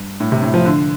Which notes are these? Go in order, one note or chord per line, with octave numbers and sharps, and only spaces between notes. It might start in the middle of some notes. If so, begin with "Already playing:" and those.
Already playing: G2
A2
C3
A2
F3
D3